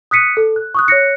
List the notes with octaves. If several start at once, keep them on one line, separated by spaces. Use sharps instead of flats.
D#6 F#6 B6 C#7 D#7
A4
F#6
C#6 D#6 F#6
C#5 F#6 A#6 C#7